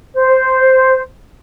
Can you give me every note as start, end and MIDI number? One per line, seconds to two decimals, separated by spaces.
0.16 1.02 72